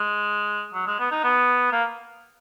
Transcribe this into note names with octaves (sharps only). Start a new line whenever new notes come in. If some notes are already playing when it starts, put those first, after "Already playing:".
Already playing: G#3
F#3
G#3
B3
D#4
B3
A#3